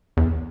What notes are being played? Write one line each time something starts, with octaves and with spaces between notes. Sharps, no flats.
E2